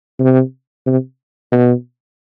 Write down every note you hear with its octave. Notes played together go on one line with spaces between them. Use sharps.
C3
C3
B2